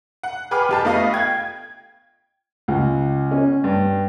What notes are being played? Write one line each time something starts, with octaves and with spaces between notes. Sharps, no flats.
F#5
G#4 B4 G5 D6 F6
F2 G4 A5
A3 B3 F4 D#5 F5
G5 G#6
C#2
C#4
G2